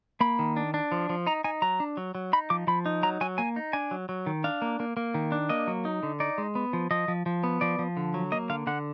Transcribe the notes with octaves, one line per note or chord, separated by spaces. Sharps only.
A#3 B5
D#3
D4
D4
F3
F3
D#4 A#5
D#4 G#5
F#3 A#5
D4
F#3
F#3
D#4 B5
F3 D6
F3 B5
D#4
F#3 A#5
F#3 G#5
A#3 G#5
D#4
D4 G#5
F#3
F#3
D#3
D4 F5
A#3
A#3
A#3
D#3
D4
A#3 D#5
F#3
D#4
D3
D#4 D5
G#3
B3
F3
F3 D#5
F3
F3
B3
F3 D5
F3
D3
F#3
A#3 D#5
D3 F5
D3 F#5